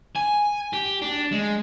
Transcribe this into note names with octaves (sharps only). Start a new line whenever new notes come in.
G#5
G4
D4
G#3